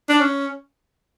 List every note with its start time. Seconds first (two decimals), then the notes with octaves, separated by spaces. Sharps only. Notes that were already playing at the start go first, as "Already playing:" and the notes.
0.09 D4
0.21 C#4